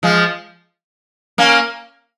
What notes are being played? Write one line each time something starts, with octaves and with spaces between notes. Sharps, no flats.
F3 G#3
A#3 C#4